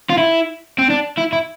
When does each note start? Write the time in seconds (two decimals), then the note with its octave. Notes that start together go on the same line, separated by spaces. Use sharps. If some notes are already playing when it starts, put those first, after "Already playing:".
0.10 F4
0.18 E4
0.78 C4
0.90 D4
1.18 E4
1.33 E4